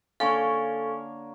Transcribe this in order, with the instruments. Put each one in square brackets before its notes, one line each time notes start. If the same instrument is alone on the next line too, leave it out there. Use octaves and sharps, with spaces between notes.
[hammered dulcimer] D3 A#3 C#5 [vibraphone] A4 [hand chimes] F5 G#5 C#6